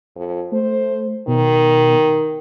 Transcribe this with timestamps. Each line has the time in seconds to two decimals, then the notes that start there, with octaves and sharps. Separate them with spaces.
0.16 F2
0.52 A3 C5
1.28 B2 D#3